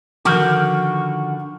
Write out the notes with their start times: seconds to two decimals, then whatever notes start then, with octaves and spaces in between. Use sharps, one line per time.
0.25 D3 D#3 F3 F#4 D6 F6 G6